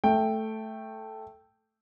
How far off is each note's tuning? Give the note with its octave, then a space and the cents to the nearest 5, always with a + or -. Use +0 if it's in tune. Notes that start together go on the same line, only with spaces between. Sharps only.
A3 +0 G5 +0